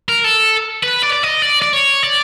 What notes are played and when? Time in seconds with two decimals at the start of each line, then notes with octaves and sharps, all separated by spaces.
0.09 A#4
0.24 A4
0.83 B4
1.03 D5
1.13 D5
1.23 D#5
1.42 D5
1.62 D5
1.73 C#5
2.03 D5